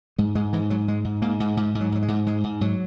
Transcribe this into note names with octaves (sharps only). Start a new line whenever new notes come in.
G#2 G#3
G#2 G#3
G#2 E3
G#2 F#3
G#2 G#3
G#2
G#2 A#3
G#2
G#2
G#2
F#3
G#2 F#3
G#3
G#2
G#2 G#3
G#2
G#2 F#3